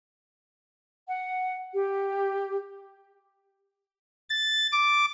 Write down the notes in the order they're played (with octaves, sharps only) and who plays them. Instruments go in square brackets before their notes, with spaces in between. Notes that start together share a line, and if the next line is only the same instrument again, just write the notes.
[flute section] F#5
G4
[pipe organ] A6
D6